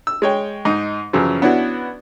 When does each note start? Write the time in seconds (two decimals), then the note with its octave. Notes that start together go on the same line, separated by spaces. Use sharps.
0.07 E6
0.22 G#3 C#5 G5
0.65 G#2 D#4
1.13 F#2 C#3 E3 F3
1.42 B3 C#4 D4 E4 F#4